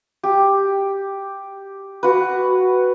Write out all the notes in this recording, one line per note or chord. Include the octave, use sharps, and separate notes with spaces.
G4
F#4 B4